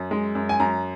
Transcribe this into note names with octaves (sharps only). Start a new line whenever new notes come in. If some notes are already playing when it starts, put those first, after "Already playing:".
Already playing: F#2
G#3
F#2
G#5
F#2 A#5